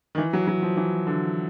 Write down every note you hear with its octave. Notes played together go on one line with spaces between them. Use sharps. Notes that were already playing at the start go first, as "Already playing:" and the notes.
D#3
E3
F#3
F#3
F3
E3
D3